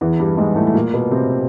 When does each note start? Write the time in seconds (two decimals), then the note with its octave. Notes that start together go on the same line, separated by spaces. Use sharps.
0.01 E2 E3
0.20 G2 G3
0.37 G#2 G#3
0.56 A2 A3
0.67 A3
0.74 A#2 A#3
0.94 B2 B3
1.11 C3 C4